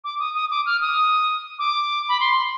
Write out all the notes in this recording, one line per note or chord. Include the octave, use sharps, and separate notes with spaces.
D6
D#6
D#6
D6
F6
D#6
D6
B5
C6